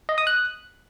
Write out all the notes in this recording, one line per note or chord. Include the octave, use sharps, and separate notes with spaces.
D#5
D#6
F#6